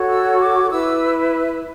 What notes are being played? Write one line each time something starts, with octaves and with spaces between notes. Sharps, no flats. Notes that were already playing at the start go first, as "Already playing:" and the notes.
Already playing: F#4 A4 C#5
E6
D6
E4 B4 E6